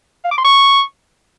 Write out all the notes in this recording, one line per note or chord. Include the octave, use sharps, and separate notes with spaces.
F5
D6
C6
C#6